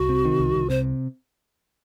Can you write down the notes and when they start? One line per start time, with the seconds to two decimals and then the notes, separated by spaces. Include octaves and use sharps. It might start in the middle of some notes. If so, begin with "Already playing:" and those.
Already playing: C2 F#4
0.09 C3
0.25 D#3
0.40 C2
0.55 C2
0.70 C3 C5